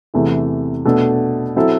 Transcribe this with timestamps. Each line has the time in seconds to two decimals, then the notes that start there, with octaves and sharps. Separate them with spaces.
0.14 E2 C3 E3 A3
0.85 B2 A3 D4 A4
1.56 F#3 C4 E4 A4